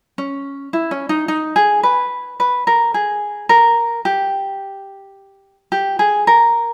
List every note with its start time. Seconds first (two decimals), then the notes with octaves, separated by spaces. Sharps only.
0.18 C#4
0.73 E4
0.91 C#4
1.09 D#4
1.28 D#4
1.56 G#4
1.83 B4
2.40 B4
2.67 A#4
2.94 G#4
3.49 A#4
4.05 G4
5.72 G4
5.99 G#4
6.27 A#4